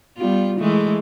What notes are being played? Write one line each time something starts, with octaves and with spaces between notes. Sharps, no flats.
G3 B3 F4
E3 G#3 A3